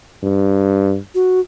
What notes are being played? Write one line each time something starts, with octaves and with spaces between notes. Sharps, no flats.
G2
F#4